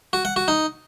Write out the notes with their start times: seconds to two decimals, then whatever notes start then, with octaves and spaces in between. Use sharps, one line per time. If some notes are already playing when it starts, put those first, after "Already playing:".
0.13 F#4
0.25 F#5
0.36 F#4
0.48 D#4